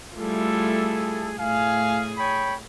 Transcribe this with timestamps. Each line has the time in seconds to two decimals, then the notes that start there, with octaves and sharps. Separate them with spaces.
0.15 G3 A3 E4 F4 G#4 A4
1.38 A2 G#4 F5 G#5
2.18 C#5 G5 B5